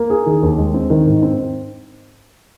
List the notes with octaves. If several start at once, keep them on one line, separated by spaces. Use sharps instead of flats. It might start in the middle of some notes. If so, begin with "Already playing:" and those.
Already playing: A#3
G#4
D#3
D#2
G#3
C4
D#3
G#2
C4